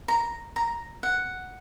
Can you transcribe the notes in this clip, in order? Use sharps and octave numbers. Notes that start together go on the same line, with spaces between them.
A#5
A#5
F#5